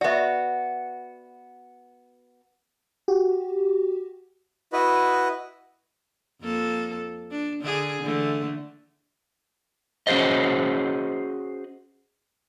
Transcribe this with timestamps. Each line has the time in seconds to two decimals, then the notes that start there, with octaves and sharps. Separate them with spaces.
0.01 B3 F#4 D5 E5
3.08 F#4 G4
4.73 E4 F#4 B4 D#5
6.42 F2 A#3 A4
7.31 D4
7.62 D3 D4 G#4
8.02 D3 E3 A3
10.07 C#4 F#4 G#4 C5 D#5